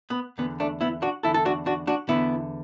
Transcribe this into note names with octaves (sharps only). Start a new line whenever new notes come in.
B3
E2 D3 B3
A3 D4
B3 E4
D4 F#4
E2 D3 E4 A4
A4
D4 F#4
D4 F#4
D4 F#4
E2 D3 B3 E4